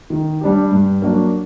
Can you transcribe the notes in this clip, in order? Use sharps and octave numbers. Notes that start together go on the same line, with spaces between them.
D#3
G3 D4 G4
G2
F#3 A#3 D4 F#4